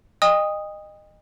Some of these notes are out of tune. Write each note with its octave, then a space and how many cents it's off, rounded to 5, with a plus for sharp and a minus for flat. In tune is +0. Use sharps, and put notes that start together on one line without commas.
D#5 -20 G5 +40 D#6 +0